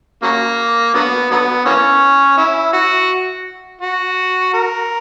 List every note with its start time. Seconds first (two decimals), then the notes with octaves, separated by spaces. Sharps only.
0.23 C#3 F#3 A#3
0.94 D3 F#3 B3
1.31 D3 F#3 B3
1.65 E3 A#3 C#4
2.38 C#4 E4
2.73 F#4
3.81 F#4
4.54 A#4